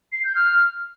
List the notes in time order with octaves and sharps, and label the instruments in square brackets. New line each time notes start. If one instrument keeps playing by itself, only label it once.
[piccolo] C7
G6
F6